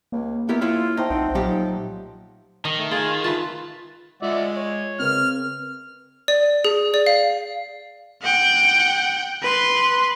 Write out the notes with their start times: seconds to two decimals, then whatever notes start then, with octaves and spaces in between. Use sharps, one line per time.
0.12 C#2 A#3
0.49 B3 E4 G4 A#4
0.61 E4 F4 C#5 F5
0.97 A3 D#4 C5 G5
1.10 B1 C4 F#5
1.35 A#2 F3 F#3 D#4 G4
2.65 D#3 D#5
2.78 A3
2.91 F4 G#4
3.24 F4 B4 E5 A5
4.22 G#3 F4 D5 E5 F#5
4.56 C#5
5.00 C#3 C4 A#4 B4 F6
6.28 D5
6.65 G#4
6.94 D5
7.07 F5
8.22 F#5 G5
9.42 B4 C6